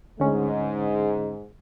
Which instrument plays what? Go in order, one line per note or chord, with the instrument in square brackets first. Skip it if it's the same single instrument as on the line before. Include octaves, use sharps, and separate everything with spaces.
[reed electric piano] D2 D3 C#4 [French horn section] G#2 G#3